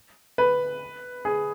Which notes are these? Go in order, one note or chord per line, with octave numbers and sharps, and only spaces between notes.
B4
G#4